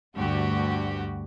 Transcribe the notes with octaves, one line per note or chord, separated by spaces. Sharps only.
D2 G2 F#4 G4